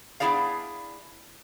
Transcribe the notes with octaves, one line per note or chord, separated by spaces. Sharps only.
B3 D4 E4 G#4 D5 F5